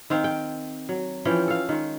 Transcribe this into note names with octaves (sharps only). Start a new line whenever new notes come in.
D#3 C4 F5 G5
G5
F#3
E3 F3 C#4 G5
A4 F5
D#3 G#3